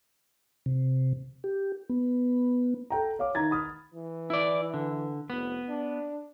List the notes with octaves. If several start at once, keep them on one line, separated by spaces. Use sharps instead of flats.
C3
G4
B3
A4 G5 A#5
C#5 F5 D6
D#3 A#5 G#6 A6
B5 D#6 F6
E3
E4 D5
D3
F1 B3
D4